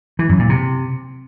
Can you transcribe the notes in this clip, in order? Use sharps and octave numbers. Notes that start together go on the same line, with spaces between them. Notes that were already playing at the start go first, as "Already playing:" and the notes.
E3
F#2
A#2
C3